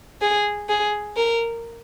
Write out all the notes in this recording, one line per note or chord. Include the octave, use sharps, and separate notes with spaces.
G#4
G#4
A#4